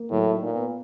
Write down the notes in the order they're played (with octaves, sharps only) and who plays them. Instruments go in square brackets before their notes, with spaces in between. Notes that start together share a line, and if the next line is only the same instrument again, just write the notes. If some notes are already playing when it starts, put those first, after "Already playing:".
Already playing: [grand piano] A#3
[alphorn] A2 [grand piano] F#3
[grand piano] D#4
[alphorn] A#2
[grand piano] B3